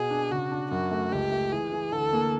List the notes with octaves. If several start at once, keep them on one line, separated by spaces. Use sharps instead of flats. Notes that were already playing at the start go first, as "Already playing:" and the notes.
Already playing: B2 G#4
D4
C#3 F#4
D4
F#2 F#4
A3
C#2 G4
A3
E3 G#4
E3
D2 A4
A#3